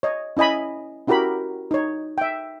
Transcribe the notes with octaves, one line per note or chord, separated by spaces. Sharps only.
C#5 D#5
C#4 E4 D#5 G#5 B5
C#4 E4 F#4 G4 A#4 B5
D#4 C#5
E5 G5